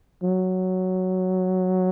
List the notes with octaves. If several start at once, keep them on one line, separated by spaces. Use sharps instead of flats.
F#3